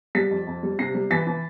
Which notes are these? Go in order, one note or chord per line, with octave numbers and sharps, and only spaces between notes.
G3 A6 B6
F2
F2
G3
C3 A#6 C7
G3
E3 A6 B6
E3